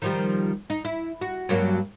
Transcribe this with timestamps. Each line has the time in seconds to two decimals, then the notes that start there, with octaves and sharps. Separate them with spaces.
0.02 D#3 F3 G3
0.70 D#4
0.85 E4
1.21 F#4
1.49 G2 F#3 A#3